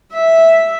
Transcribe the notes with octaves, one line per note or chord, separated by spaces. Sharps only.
E5